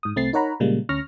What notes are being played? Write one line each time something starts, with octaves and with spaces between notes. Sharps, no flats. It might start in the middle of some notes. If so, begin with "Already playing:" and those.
G#2 D#6
C2 A3 C4 A6 C7
D#4 A#4 C#5 F#5 A#5 B5
A#2 C#3 G3 G#3 A#3
D2 C#4 C#6 F6 A#6